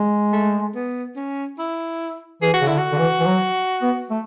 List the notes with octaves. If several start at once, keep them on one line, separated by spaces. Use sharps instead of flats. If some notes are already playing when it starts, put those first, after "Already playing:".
Already playing: G#3
A3
B3
C#4
E4
E3 G#4
F#4
C#3
D3 E4
F#4
D3
E3
E3
F#3
B3
A3